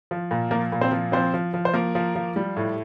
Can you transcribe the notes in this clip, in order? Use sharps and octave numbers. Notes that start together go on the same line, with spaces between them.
F3
A#2
F3 A#3 A#4
A#2
C4 C5
F3
F3 C4 C5
F3
F3
C5
F3 A#3 A#4
F3
F3
G3
A2